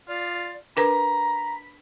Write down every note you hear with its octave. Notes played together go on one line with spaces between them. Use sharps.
F4 D5
D4 A#4 B4 A#5 B5